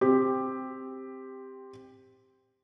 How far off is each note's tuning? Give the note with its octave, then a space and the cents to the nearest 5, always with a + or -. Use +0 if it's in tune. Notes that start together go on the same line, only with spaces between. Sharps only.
C4 +0 G4 +10